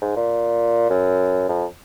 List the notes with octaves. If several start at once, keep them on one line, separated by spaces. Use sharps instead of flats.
G#2
A#2
F#2
F2